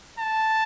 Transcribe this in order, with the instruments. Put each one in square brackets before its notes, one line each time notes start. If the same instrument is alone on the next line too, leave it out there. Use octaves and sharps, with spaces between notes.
[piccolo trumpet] A5